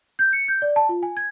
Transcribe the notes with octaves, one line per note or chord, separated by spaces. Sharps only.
G6
C#7
G6
D5
A5
F4
G#5
G#6